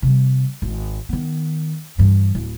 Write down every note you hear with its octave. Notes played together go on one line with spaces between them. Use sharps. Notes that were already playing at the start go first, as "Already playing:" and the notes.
C3 G3
G#1
D#3 B3
G2 E3
D1